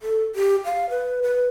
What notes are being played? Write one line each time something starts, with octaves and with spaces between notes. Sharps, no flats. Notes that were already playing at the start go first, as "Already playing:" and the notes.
A4
G4
F5
B4
B4